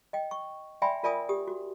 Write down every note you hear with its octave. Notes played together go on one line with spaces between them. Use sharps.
D#5 G5
C#6
D5 E5 G5 G#5 B5 C6
F4 A#4 D5 E5 G#5 D#6
G4 D#6
F#4